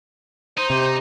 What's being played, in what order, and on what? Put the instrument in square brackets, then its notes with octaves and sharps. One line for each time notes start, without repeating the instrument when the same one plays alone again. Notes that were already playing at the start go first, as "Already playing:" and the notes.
[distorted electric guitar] D#4 [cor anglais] C5
[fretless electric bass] C3 [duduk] G4 [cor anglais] C5